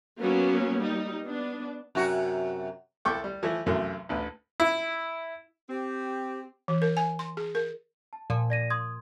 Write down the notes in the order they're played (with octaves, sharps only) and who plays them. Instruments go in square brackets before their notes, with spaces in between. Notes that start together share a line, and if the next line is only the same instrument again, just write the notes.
[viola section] F#3 A#3 B3 C#4
G3 D#4
B3 D4
[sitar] F#2 C3 F#4
[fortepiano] C2 E4 A4 G5 C#6 D6
G3
E3 F3 A3
B1 F#2 C3 E3 F#3 A3
A1 D2 B4
E4
[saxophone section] C4 [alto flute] G4
[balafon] E3
A#4
G#5
C6
G#4
A#4
[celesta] A5
[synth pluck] A#2 F3
[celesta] D5 A#6 D#7
C6 D#6 G#6